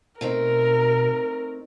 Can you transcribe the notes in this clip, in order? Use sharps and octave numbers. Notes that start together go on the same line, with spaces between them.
B2 A3 C4 D#4 A#4